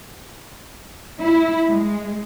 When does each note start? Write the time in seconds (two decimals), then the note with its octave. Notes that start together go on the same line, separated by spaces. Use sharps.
1.21 E4
1.68 G#3